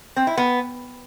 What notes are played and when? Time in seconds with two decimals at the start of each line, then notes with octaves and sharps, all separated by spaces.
0.16 C4
0.27 E4
0.37 B3